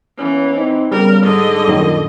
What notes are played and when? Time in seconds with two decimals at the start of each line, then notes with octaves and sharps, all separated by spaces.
0.18 E3 A#3 B3 C#4
0.55 C4 D#4
0.91 C#3 G3 B3 A#4
1.23 G#2 D3 D#5
1.68 F#2 A#2 D#3